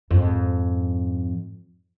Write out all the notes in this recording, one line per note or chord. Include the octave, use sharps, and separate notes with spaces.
F2 G#2